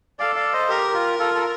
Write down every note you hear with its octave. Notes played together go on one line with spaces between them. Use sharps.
A4 D5 F5
D5 F5
C5 D#5
G4 A#4
F4
F4 A4
A4